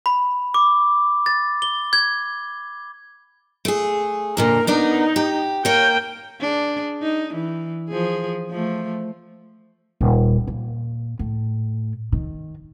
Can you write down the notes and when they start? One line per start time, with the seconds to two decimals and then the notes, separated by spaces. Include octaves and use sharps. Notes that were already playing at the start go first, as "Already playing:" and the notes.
0.06 B5
0.54 D6
1.26 A6
1.62 G7
1.93 G#6
3.65 A3 G#4
4.37 F2 A#2 D3 A#4
4.67 B3 D4 D#4 A#4
5.16 G4
5.65 A#3 A#4 C#5 G5
6.41 D4 G#4
7.02 D#4
7.34 E3
7.89 F3 G#4
8.50 F3 A3
10.01 D#1
10.47 A#2
11.19 A2
12.12 D#3